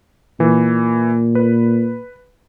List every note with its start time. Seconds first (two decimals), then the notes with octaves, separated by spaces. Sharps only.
0.40 A#2 E3
1.35 B4